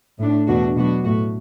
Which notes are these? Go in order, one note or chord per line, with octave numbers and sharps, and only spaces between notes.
A2 A3 D4
E2 B2 A3 D4 F#4
B2 F#3 B3 D4 F#4
A2 A3 F#4